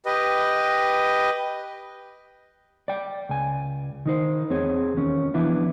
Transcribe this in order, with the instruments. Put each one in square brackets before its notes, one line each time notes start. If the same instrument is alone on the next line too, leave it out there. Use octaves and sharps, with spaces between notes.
[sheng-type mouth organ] G4 B4 D#5
[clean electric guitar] D5 G5
C#2 G#5
D#3 D#4 C5
E2 C4 G#4 C#5
D#2 C#4
E3 F3 B3 D4 E4